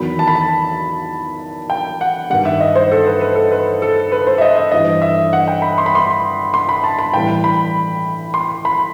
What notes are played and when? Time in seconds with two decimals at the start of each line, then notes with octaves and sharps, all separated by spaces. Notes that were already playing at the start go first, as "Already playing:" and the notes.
Already playing: E2 D#3 F#3 B5
0.19 A5
0.28 B5
0.35 A5
1.70 G5
2.01 F#5
2.30 G2 D#3 G3 F#5
2.45 E5
2.61 D#5
2.76 C5
2.92 A4
3.07 B4
3.21 B4
3.36 A4
3.52 B4
3.82 A4
4.12 B4
4.27 C5
4.38 E5
4.41 D#5
4.56 E5
4.72 G2 E3 G3 D#5
5.02 E5
5.33 F#5
5.48 G5
5.62 B5
5.78 C6
5.86 B5
5.95 C6
6.54 C6
6.69 B5
6.84 A5
6.99 B5
7.14 A2 E3 G3 G5
7.44 B5
8.34 C6
8.65 B5